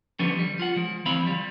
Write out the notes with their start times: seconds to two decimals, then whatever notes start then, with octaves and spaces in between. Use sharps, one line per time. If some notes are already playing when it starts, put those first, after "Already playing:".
0.19 D3 F3 G3 B3 C#4
0.39 G3
0.59 F4 F#5
0.76 F3 G#3
1.06 D2 E3 C4 F5 B5
1.23 F3 G3